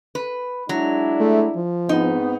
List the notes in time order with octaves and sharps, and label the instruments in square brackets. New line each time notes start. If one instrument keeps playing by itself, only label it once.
[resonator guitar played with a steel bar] B4
[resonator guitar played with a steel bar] F#3 [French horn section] G#3 D4 E4
[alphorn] A3
F3
[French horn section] G#2 B3 C4 [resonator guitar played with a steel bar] D#4